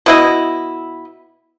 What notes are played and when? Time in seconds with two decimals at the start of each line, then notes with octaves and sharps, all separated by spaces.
0.06 B2 E4 D#5